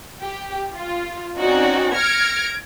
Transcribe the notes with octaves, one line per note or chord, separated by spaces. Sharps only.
G4
F4
C4 C#4 D#4 F#4 D5
F6 G#6 A#6 C#7 D7